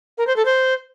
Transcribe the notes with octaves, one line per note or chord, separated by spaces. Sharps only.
A#4
C5
A4
C5